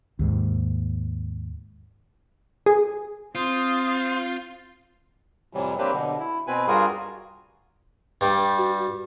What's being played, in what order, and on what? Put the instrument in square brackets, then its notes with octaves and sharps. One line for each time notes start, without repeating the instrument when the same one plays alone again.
[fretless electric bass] D#2 G#2
[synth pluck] G#4
[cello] C4 [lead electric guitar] F4 [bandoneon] C5 [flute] D#6
[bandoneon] F2 A2 C3 E3 F#3 G3
F#3 A#3 C4 D4 G4 B4
B2 D3
E4
B2 C4 B4 G#5
G2 G3 F4 F#4 G#4 A#4
[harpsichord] G2 G3
[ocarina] F#4